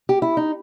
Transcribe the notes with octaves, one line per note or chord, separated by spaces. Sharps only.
G4
E4
D#4